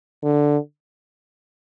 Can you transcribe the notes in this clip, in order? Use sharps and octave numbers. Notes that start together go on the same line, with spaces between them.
D3